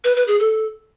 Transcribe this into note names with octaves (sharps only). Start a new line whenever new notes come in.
B4
B4
G#4
A4